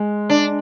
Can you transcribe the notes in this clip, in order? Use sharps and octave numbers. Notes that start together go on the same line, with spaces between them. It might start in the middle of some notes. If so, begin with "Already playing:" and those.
Already playing: G#3
D4